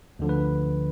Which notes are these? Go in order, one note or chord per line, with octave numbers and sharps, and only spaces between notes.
D2 D3 F3
B4